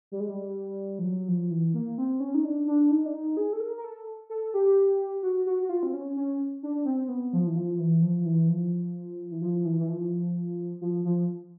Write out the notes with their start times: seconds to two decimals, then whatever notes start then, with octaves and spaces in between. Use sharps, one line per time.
0.11 G3
0.20 G#3
0.28 G3
0.99 F3
1.04 F#3
1.28 F3
1.51 E3
1.74 A#3
1.98 C4
2.20 C#4
2.34 D#4
2.44 D4
2.67 D4
2.91 D#4
3.06 D4
3.14 D#4
3.37 G#4
3.53 A4
3.60 A#4
3.78 A#4
3.84 A4
4.30 A4
4.54 G4
5.23 F#4
5.46 F#4
5.62 F#4
5.69 F4
5.83 C4
5.93 C#4
6.17 C#4
6.63 D4
6.86 C4
7.09 B3
7.33 F3
7.47 E3
7.56 F3
7.79 E3
8.02 F3
8.25 E3
8.49 F3
9.31 E3
9.42 F3
9.65 E3
9.79 E3
9.89 F3
10.81 F3
11.05 F3